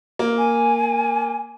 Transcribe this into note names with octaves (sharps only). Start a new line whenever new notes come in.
A#3
G#5